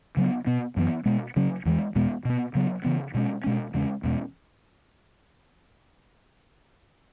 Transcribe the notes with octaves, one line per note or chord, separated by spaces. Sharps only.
C#3 F#3 B3
B2 B3
F#2 E3 B3
B2 G#3 B3
C#3 F#3 C#4
E2 E3 G#3
E2 B2 G#3 B3
B2 B3
C#3 F#3 B3
C#3 E3 B3
B2 G#3 C#4
B2 G#3 C#4
E2 C#3 G#3 C#4
E2 B2 G#3 C#4